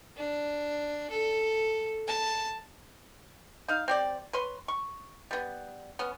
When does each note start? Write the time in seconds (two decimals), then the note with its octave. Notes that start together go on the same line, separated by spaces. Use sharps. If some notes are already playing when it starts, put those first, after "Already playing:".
0.17 D4
1.10 A4
2.07 A5
3.68 D#4 F5
3.88 C4 G4 D5
4.33 B4 C#5 C6
4.68 C#6
5.31 G3 B3
5.99 B3 C#4